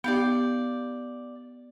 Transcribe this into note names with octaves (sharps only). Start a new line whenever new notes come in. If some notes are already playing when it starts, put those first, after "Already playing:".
B3 D#4 G4 D5 F5 G5